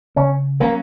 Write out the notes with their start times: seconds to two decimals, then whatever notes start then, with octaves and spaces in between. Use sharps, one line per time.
0.16 C#3 C#4
0.60 F#3 A#3 C#4